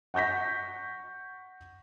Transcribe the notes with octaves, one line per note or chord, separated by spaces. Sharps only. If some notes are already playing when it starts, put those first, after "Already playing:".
F#5 C#6 G6 A#6 B6